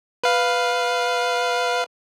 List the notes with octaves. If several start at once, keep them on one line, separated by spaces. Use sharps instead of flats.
B4 F5